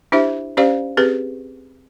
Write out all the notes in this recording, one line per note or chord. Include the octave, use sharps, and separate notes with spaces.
D4 E4 G4 C5 E5
C#4 G4 C5 D5 F5
C4 G4 G#4 B4